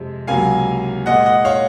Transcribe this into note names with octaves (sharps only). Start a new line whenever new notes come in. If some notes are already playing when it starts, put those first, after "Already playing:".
Already playing: F2 C3 F3 G#3
C#2 C3 F#3 A#3 F5 G#5
A#2 G#3 D#5 F#5
D#5 F#5
C#5 F5